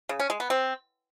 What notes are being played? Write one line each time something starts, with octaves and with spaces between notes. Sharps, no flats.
C#3
C#4
G#3
B3
C4